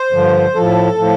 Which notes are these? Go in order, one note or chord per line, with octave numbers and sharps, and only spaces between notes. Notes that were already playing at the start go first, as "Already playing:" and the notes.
Already playing: C5
G2 D3 F3
A2 F3 A4
A2 F3